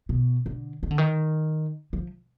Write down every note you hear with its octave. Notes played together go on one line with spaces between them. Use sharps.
B2
D3
D#3
D3
D#3
F3